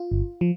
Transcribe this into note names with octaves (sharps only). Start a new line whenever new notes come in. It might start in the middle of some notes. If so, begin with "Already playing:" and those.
Already playing: F4
G1
F3